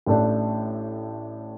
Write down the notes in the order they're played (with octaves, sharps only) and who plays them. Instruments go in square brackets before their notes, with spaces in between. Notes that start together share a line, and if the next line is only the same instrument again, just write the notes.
[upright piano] A1 A2 A3 D4